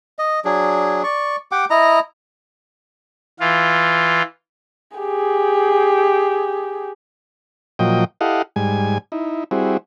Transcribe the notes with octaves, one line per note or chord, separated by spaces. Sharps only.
D#5
F#3 D4 G#4
D5 C#6
G4 F#5 G5 D6
E4 D#5 A#5
E3 F4
G4 G#4
A#2 F3 F#3 D#5 G5
E4 G4 A4 D#5 F5 F#5
G#2 G3 G#5
D#4 E4
G3 C4 E4 F#4 G#4